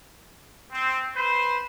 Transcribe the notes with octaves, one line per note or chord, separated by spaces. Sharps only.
C4
B4 C5